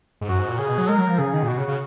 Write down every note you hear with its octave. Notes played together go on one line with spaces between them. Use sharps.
G#2
F#2 F#4
G#2
A#2
C#3 G#4
B2
F#3
G#3 A#4
F#3
F3
C#3 G#4
D#3
A#2
B2 F#4
C#3
C#3